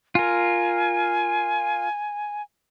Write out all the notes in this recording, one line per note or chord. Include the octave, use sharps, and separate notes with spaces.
F4 A#4 G#5